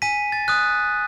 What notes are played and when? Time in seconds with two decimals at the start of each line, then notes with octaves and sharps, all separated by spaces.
0.02 G#5 B6 D#7
0.32 A6
0.48 D#6 F#6